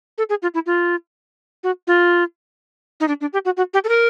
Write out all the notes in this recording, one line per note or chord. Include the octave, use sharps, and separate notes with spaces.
A4
G#4
F4
E4
F4
F#4
F4
D#4
D4
D4
G4
F#4
F#4
G4
A4
A#4